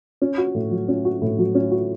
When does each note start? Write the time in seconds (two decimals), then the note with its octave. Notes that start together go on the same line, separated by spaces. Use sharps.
0.22 C#4
0.38 F#4
0.55 A2
0.71 F#3
0.88 C#4
1.05 F#4
1.22 A2
1.39 F#3
1.55 C#4
1.71 F#4